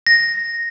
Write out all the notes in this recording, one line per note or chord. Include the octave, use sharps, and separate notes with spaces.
A#6